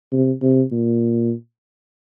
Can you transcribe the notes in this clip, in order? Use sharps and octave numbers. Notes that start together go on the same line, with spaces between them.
C3
C3
A#2